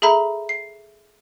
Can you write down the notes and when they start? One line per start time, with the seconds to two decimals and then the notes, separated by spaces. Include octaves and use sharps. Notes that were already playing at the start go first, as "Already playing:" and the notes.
0.02 G#4 A4 E5 A#5 B5
0.49 C7